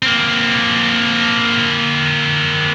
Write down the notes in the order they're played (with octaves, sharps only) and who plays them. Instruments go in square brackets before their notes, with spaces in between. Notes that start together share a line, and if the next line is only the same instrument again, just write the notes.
[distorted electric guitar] A#3 C4